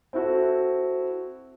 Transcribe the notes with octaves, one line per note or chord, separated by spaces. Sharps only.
C4 E4 F#4 A4